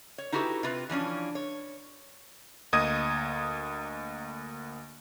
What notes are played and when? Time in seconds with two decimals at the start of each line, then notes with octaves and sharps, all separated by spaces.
0.18 C#5
0.32 D#4 E4 F#4 G4 A4 B4
0.63 C3 F4 B4
0.90 E3 F3 C#4 D4
1.35 C#5
2.73 D2 A#3 D#5 D#6 G#6 D#7